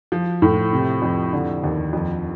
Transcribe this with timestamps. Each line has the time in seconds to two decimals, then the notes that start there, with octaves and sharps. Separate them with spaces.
0.12 F3
0.42 A2
0.73 C3
1.02 F2
1.33 D3
1.63 D#2
1.93 F2